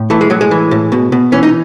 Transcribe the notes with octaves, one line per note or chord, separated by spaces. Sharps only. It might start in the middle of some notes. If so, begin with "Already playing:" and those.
Already playing: A2
E3 A3
G#3
A2 F#3
G#3
E3
A2
B2
B2
E3 C#4
D#4